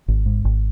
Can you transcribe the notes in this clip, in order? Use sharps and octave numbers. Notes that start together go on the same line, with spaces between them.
G#1
G#2
G#1